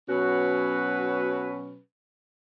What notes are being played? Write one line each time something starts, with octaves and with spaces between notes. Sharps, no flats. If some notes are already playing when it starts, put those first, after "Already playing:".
B2 F#3 C#4 F#4 B4